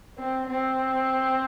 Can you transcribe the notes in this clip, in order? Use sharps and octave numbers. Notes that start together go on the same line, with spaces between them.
C4
C4